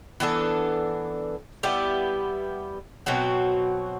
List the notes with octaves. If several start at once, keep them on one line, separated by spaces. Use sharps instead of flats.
E3 B3 D4 A4
G3 B3 E4 G4
B2 F#3 C4 F#4